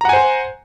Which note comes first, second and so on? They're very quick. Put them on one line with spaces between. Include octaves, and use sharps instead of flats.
A#5 F#5 G#5 C5